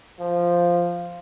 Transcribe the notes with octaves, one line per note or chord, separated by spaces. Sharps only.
F3